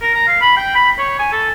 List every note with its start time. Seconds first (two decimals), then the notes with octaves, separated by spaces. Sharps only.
0.01 A#4
0.14 A#5
0.27 F5
0.41 B5
0.57 G5
0.75 B5
0.99 C#5
1.19 G#5
1.32 A4